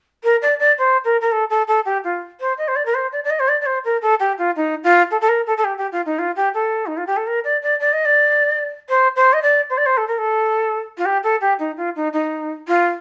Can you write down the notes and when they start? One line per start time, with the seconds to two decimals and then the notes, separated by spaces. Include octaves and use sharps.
0.23 A#4
0.41 D5
0.59 D5
0.78 C5
1.04 A#4
1.21 A#4
1.31 A4
1.50 A4
1.67 A4
1.85 G4
2.04 F4
2.40 C5
2.57 D#5
2.67 C5
2.75 D5
2.85 A#4
2.94 C5
3.12 D5
3.24 D5
3.30 D#5
3.39 C5
3.48 D5
3.61 D5
3.65 C5
3.84 A#4
4.01 A4
4.19 G4
4.38 F4
4.56 D#4
4.83 F4
5.10 A4
5.21 A4
5.28 A#4
5.46 A4
5.57 A4
5.64 G4
5.77 G4
5.91 F4
6.05 D#4
6.18 F4
6.36 G4
6.54 A4
6.86 D#4
6.97 F4
7.06 G4
7.16 A4
7.27 A#4
7.44 D5
7.62 D5
7.80 D5
7.92 D#5
8.05 D5
8.89 C5
9.16 C5
9.33 D#5
9.42 D5
9.69 C5
9.77 D5
9.85 C5
9.97 A4
10.07 A#4
10.18 A4
10.97 F4
11.05 G4
11.23 A4
11.41 G4
11.59 D#4
11.77 F4
11.95 D#4
12.13 D#4
12.67 F4